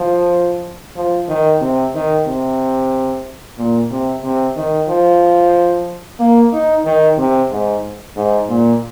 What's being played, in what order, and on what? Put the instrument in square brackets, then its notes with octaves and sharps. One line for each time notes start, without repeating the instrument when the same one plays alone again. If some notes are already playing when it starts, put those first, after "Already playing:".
Already playing: [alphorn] F3
F3
D#3
C3
D#3
C3
A#2
C3
C3
D#3
F3
A#3
D#4
D#3
C3
G#2
G#2
A#2